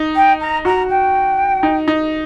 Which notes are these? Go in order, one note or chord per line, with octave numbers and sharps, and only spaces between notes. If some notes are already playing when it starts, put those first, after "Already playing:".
Already playing: D#4
G5
A#5
F#4 A#5
G5
D#4
D#4